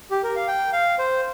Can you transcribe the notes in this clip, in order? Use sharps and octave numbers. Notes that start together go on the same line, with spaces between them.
G4
A#4
F5
G5
F5
C5